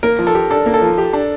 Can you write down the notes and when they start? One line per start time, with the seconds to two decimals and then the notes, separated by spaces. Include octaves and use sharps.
0.03 A#3 A#4
0.19 F3
0.27 A4
0.35 G4
0.50 D4 A4
0.66 A#3
0.74 A4
0.82 F3
0.98 G4
1.13 D4